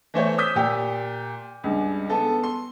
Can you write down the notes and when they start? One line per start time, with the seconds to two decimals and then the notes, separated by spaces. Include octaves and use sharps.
0.14 E3 A3 C5 C#5
0.38 D#6 E6 G6 B6
0.56 A#2 G4
1.64 C#2 G2
2.10 B3 A4
2.44 C6